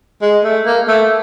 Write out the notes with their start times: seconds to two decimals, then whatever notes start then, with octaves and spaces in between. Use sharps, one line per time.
0.22 G#3
0.44 A3
0.66 A#3
0.88 A3